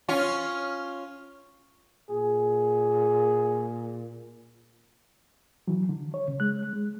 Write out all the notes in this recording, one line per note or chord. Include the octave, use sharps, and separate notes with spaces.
C#4 F4
A#2 G#4
E3 F#3
D3
C#5
C#3
G#3 F#6
G#3